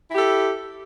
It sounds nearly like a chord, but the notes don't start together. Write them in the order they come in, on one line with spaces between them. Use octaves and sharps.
E4 G4 A4